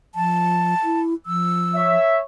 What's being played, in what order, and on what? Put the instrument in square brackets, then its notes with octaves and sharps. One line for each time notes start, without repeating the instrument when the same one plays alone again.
[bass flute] F3 [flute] A5
[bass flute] E4
[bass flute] F3 [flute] E6
[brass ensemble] C#5 E5